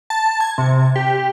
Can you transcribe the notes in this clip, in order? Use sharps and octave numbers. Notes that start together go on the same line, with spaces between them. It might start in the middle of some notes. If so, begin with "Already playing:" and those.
A5
G#6
C3
G4